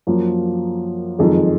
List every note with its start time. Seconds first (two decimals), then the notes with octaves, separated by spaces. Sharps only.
0.07 F#2 F3 A#3
1.19 F#1 F2 D#3 G#3